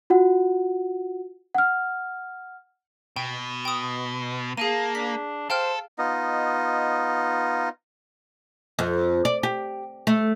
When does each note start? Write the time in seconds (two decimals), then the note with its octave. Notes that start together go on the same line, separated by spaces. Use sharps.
0.10 F4 F#4 F#5
1.55 F#5 F6
3.16 B2 G5
3.65 G5 D#6
4.57 A#3 G#4 F5 A5 D#7
4.95 D4 B6
5.50 A4 C5 F5 G5 F6
5.98 B3 D#4 F4 D#5
8.79 F2
9.25 D5
9.43 G4
10.07 A3